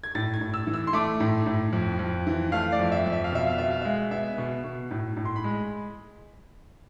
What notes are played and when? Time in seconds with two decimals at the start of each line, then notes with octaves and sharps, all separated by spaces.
0.04 G#6
0.15 A2 A6
0.34 G#6
0.41 A2
0.54 E6
0.67 E3
0.74 E6
0.87 C6
0.93 A3 D6
1.20 A2
1.46 A2
1.73 F2
1.99 F2
2.27 E3
2.52 A3 F5
2.72 D5
2.79 F2
2.92 E5
3.06 F2
3.12 E5
3.24 F5
3.32 B2 E5
3.46 F5
3.58 B2 E5
3.70 F5
3.82 G#3 E5
4.11 B3 E5
4.38 B2
4.64 B2
4.91 A2
5.17 A2
5.25 C6
5.36 B5
5.44 G#3